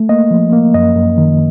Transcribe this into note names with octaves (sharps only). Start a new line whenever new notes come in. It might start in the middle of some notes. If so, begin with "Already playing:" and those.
Already playing: A3
A#3 D#5
F3
A#3
F#2 D#5
F#2
D#3